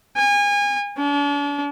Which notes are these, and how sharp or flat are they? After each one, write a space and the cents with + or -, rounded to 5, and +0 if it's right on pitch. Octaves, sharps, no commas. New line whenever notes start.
G#5 -30
D4 -40